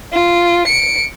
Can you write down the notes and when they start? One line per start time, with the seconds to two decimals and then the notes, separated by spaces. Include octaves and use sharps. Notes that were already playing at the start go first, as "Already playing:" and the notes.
0.12 F4
0.67 C#7 D7